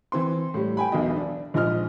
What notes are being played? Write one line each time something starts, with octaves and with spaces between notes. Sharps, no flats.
E3 C4 C6
A2 G3
G5 G#5 B5
E1 B1 B2 D#5
D4
A#1 G#2 F3 D#5 F6